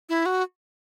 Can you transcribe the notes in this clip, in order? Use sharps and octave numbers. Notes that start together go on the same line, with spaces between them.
E4
F#4